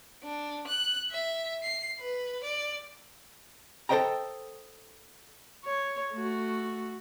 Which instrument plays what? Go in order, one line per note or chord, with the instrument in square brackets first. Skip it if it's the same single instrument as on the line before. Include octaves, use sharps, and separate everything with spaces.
[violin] D4
F#6
E5
C7
B4
D5
[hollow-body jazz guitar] A4 B4 C5 D#5 G5 A#5
[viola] C#5
A3 F#4